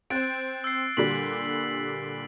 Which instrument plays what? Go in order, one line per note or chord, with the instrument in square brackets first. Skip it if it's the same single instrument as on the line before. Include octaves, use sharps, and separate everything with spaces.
[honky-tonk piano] C4 C5 [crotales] F#6 A6 D7
[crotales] E6 C7
[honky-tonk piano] A#2 D3 G3 [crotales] B6 F#7